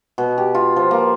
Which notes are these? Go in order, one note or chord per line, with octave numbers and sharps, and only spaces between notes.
B2
G4
F4
F3
A#3